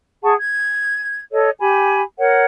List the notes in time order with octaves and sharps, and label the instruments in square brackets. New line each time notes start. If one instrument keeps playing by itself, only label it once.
[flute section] G#4 F#5 A5 C#6
G#6
A4 C#5 D#5
G4 G#5 B5
A#4 C#5 F#5